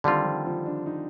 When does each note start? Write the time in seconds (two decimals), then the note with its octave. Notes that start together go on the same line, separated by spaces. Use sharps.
0.04 D3 D#3 G3 C4 F4
0.24 F3
0.46 F3
0.66 D4
0.86 D#4